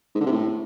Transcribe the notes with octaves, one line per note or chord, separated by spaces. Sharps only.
G#2
D3
C3
A2